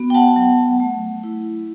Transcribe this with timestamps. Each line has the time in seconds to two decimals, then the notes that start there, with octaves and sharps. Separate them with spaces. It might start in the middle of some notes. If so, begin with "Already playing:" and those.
Already playing: B3 F#4
0.10 G5
0.14 F#5 A5
0.36 F#3
0.80 A3
1.24 E4